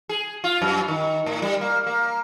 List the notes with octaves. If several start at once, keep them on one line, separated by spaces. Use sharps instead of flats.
G#4
F4
F#2
D#3
A2
G3
A#3
A#3